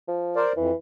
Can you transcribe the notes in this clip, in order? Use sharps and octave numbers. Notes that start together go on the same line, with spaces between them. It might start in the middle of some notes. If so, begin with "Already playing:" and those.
F3
A#4 C5 D5
F2 E3